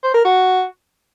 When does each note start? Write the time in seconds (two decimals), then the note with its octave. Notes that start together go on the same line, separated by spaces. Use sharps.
0.03 C5
0.14 A#4
0.24 F#4